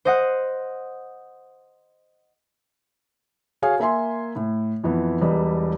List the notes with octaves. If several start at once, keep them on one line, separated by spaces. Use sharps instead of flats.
C5 D#5 F#5
F#4 G#4 C#5 F5 G#5
A#3 E5 G#5 C6
A2
F2 E3 B3
E1 E2 G3 B4 D#5